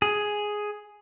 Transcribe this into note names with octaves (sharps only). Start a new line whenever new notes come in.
G#4